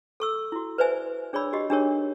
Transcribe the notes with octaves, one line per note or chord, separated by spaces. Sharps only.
A4 C#6 E6
E4 F#4
B4 C5 D5 E5 G#5
D4 G#4 C#5 D5 B5 E6
F#4 G4 D#5
D4 D#4 G4 G#4 A#4 C#5